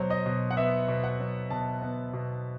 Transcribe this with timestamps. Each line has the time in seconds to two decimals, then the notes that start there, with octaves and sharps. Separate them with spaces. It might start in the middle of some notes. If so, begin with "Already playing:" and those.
Already playing: B2 F#3 C5
0.10 D#5
0.26 B2
0.51 F#5
0.57 B3 E5
0.88 B2
1.04 F#5
1.19 F#3
1.50 B2 A5
1.82 B3
2.13 B2